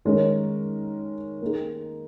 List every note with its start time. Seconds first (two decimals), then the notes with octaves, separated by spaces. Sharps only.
0.05 D#3 G#3 C#4 A#4 C#5
1.42 A#3 D#4 G#4